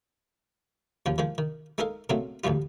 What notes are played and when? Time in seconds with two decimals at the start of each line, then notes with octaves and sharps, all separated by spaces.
1.06 D#2 C#3 F3
1.18 D#3 F3 G#3
1.38 D#3
1.78 G#3 D#4 A4 A#4 F5
2.10 A#2 C#3 F#3 A3 C4
2.44 A1 D2 G#2 G3 F4